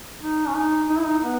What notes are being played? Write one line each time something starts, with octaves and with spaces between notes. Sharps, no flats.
D#4
C#4
D#4
D#4
E4
D#4
B3